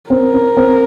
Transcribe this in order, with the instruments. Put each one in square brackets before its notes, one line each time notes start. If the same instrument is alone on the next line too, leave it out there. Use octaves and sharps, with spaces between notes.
[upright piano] C4 [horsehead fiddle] A#4
[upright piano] C4
C4